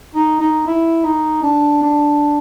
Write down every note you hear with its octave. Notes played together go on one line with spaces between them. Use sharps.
D#4
D#4
E4
D#4
D4
D4